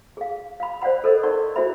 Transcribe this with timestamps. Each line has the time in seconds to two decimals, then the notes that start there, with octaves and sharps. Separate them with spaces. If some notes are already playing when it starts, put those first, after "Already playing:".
0.17 G#4 F5
0.60 F5 B5
0.82 C5 D5 F5 F#5 B5
1.04 A4 A#4 C5 D#5
1.23 D#4 A#4 D5 F#5 C6 C#6
1.56 E4 F#4 G#4 C5 E5 B5